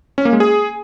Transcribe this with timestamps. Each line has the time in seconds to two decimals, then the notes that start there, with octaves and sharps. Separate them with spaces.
0.18 C#4
0.25 A#3
0.33 G#3
0.40 G#4